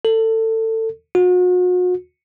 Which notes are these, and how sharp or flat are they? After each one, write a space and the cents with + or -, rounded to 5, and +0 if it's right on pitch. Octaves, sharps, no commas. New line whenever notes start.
A4 +25
F#4 -40